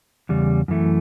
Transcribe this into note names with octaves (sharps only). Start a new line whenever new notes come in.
E2 C#3 G3
F#2 E3 A3